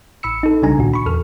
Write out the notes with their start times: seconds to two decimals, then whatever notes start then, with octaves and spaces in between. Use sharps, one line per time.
0.23 A1 B5 E6 C#7
0.43 D#4 A4
0.62 B1 C#3 G3 D4 G#5 A#5
0.77 D2 A#2 D#3 F#4
0.94 B5 C#6
1.06 E2 A4 F6